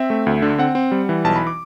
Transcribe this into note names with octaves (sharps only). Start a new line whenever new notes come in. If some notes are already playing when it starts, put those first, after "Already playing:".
Already playing: C4 E5
A3
D2
D3
C4 F#5
C4
G3
E3
B1 A5
B5
D6